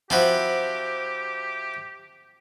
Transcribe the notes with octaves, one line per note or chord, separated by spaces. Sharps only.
F3 C4 E4 F#4 G4